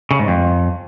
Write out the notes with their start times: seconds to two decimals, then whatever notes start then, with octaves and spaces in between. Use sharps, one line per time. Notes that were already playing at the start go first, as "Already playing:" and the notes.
0.11 C#3
0.19 G#2
0.28 F2